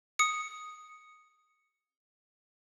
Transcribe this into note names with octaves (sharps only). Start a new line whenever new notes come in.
D#6 C#7